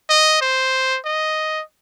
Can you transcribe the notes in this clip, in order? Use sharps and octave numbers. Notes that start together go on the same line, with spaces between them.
D#5
C5
D#5